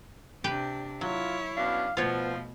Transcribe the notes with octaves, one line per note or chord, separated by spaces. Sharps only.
C3 D4 G4 B4 G5
F#3 E4 F4 C#5
B2 C#4 D4 F5
B2 F3 A3 B3 F4 C#5